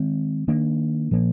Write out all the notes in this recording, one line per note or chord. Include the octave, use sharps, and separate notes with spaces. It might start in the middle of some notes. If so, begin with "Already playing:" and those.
Already playing: D#3 G#3 C4
D#3 A#3 D4
A#2 F3 A#3